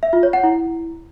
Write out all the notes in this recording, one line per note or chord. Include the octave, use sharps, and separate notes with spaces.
E5
F4
C#5
F#5
E4